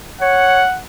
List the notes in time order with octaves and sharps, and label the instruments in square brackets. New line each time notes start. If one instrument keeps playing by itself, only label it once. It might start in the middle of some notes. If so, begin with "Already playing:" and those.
[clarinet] C#5 [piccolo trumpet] F#5